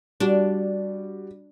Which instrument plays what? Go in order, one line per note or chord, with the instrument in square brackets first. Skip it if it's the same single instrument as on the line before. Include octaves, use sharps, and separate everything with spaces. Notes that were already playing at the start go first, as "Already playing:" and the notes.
[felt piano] G3 F#4 [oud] D4